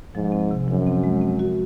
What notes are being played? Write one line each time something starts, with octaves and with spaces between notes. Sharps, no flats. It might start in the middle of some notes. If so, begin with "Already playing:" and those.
G#2 F3
C4
C3
F#2 F3
C4
G#3
C4
F#4